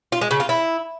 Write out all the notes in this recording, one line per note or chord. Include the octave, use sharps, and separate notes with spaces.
F4
G#3
C#3
F4
E4